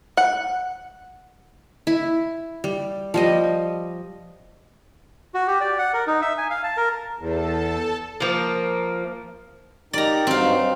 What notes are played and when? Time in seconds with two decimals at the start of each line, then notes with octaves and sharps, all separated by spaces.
0.17 F#5
1.87 E4
2.64 G3
3.14 F3 G3 D#5
5.34 F#4
5.48 G4
5.60 D5
5.78 F#5
5.94 A#4
6.07 D#4
6.22 E5
6.38 G#5
6.50 F5
6.64 A5
6.77 A#4
7.19 E2 A4 A5
8.20 F3 A#3
9.93 D#4 G4 A#4 D5 A#5
10.27 G2 F#3 C4 D#4 F5